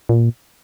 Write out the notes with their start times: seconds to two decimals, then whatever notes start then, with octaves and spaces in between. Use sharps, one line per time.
0.09 A#2